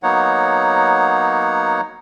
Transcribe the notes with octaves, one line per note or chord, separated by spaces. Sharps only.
F#3 A#3 B3 D#4 C#5 F#5